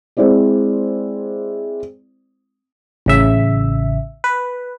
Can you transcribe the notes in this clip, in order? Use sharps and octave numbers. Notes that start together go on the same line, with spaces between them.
G#3 C4 E4 C5 D5
A1 C#3 E5
B4